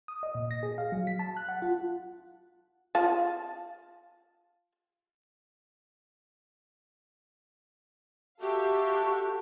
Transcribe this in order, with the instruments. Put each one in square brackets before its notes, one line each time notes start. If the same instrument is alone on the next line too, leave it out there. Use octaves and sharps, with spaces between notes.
[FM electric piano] D#6
D#5
A#2
A#6
G#4
F5
F#3
B6
A5
F#6
F#5
F4
[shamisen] F4 A5
[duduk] F#4 [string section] G4 E5 F5 [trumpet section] A4